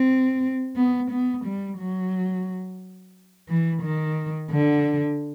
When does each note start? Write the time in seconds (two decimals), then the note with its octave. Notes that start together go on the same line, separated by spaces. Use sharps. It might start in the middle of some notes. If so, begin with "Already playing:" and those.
Already playing: C4
0.76 B3
1.11 B3
1.45 G3
1.78 F#3
3.49 E3
3.83 D#3
4.51 D3